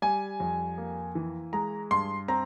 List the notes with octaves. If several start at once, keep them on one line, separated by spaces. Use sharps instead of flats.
G3 G#5
F2
A#3
E3
G#3 A#5
G2 C6
C4 A#5